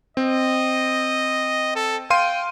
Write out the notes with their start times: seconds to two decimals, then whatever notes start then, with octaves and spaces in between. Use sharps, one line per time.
0.17 C4 D#5
1.75 A4
2.10 F5 G5 C6 D#7